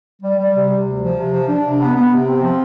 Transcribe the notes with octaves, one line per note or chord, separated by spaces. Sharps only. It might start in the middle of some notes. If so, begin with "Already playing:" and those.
G3
G3
C3
C3
D2
F3
C3
F3
D4
C3
B3
B3
C3
C4
F3